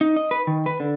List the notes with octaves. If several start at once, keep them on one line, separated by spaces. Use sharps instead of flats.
D#4
D#5
B4
D#3
B4
D3